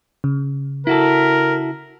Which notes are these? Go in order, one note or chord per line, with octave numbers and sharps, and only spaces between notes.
C#3
E4 F#4 A4 A#4